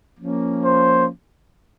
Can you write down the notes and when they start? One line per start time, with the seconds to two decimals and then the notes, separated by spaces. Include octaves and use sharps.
0.20 F3 A#3 C#4
0.64 C5